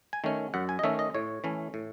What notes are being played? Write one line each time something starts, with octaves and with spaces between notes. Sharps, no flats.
G#5
D#3 A3 C#4
F#2 F#5
G#5
D#5
D#3 A3 C#4 E5
D#5
A2 C#5
E3 A3 C#4
A2